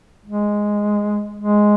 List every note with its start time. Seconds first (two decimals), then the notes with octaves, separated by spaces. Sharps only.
0.25 G#3
1.39 G#3